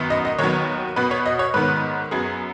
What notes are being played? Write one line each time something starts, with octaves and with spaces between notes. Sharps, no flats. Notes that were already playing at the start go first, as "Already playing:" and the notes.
Already playing: F#2 D#3 B3
D#5
D#5
D#2 D#3 F#3 B3 C#5
B2 B3 B4
C#5
D#5
C#5
G#2 D#3 B3 B4
F#2 F#3 B3 G#4